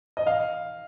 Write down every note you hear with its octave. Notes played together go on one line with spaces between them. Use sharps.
D#5
F5